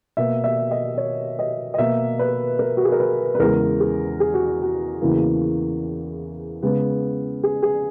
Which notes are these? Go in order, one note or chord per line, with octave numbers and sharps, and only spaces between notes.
B2 A#3 E5
E5
D#5
C#5
D#5
D#5
B2 A#3 E5
B4
A#4
F#4
G#4
A#4
B4
B4
E2 C#3 G#3 A#4
G#4
G#4
F#4
F#4
E2 C#3 E3 A#3
C#3 G#3 B3
G#4
G#4